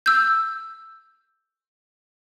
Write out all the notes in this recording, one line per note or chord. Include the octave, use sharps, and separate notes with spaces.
E6 G6